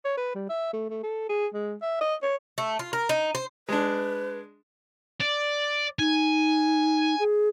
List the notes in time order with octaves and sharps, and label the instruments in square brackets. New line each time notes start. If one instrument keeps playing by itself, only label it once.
[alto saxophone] C#5
B4
G3
E5
A3
A3
A4
G#4
G#3
E5
D#5
C#5
[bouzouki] A3
F4
A#4
D#4
C5
[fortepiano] G#3 D4 [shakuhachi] B4
[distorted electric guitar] D5
[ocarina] D#4 [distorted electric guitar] G#5
[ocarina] G#4